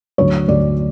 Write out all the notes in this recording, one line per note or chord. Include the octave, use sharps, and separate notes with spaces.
D2 D3 F#3 C#5
D2 D3 F#3 D5